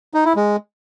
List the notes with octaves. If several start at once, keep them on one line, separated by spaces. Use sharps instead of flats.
D#4
E4
G#3